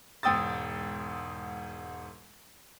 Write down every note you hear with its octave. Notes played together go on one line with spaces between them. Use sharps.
E1 G#2 G5 D#6 E6 A6